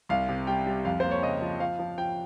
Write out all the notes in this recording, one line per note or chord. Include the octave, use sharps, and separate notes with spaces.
C2 F5
C3
G3 G5
G3
F2 F5
A#3 C5
C#5
C#3 D#5
F3
F3 F5
F3
F3 G5